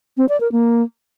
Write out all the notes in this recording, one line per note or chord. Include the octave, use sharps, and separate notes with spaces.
C4
D5
A#4
A#3